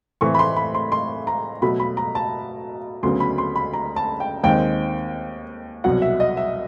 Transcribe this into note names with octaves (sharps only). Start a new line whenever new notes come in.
A2 E3 A3 C4 C#6
B5
C6
B5
C6
C6
A#5
B2 F#3 A3 B5
B5
A#5
A5
D2 C#3 F#3 B3 C6
B5
C6
B5
A#5
A5
G5
D#2 D#3 G#3 C4 G5
C2 B2 F#3 F#5
E5
D#5
E5